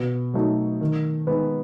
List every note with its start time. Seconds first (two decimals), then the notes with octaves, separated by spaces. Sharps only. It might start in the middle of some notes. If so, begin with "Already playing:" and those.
Already playing: B2
0.34 F#3 A3 D#4
0.81 D#3
1.27 G#3 B3 D#4